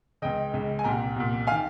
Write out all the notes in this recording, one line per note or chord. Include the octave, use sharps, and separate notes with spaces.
C#2 C#3 D#5 G5
C#2 C#3
G#5
C2 A#2 G5 A#5
C2 A#2
F5 G#5
D#3